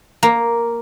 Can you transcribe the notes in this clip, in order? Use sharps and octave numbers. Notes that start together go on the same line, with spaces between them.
A#3